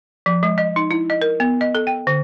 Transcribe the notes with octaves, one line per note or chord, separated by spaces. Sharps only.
F3
G#3
D#5
D#4
E4
D#5
A#4
B3
D#5
A4
G5
D3